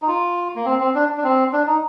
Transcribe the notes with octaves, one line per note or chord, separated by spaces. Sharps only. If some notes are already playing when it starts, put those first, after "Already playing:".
D#4
F4
A#3
C4
C4
D4
D4
C4
D4
D#4